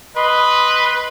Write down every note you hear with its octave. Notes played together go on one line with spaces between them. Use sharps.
B4 D#5 B5 C6